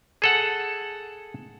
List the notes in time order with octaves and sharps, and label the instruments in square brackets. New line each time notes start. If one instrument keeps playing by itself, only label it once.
[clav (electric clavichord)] G#4 A4 F#5